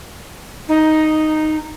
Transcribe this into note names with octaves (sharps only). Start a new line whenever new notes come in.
D#4